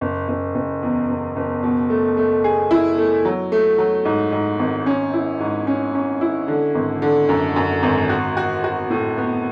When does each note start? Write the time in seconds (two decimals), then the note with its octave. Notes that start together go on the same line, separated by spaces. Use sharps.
0.01 F#1
0.28 F#1
0.55 F#1
0.82 E2
1.09 F#1
1.36 F#1
1.63 B2
1.90 A3
2.17 A3
2.44 G#4
2.71 E4
2.98 A3
3.25 F#3
3.52 A3
3.78 F#3
4.05 G#2
4.32 G#2
4.59 G#1
4.86 C#4
5.13 E4
5.40 G#2
5.67 C#4
5.95 C#4
6.21 E4
6.48 D3
6.75 G#1
7.02 D3
7.29 F#2
7.56 F#2
7.83 G#1
8.09 F#4
8.37 F#4
8.64 F#4
8.90 A2
9.18 B3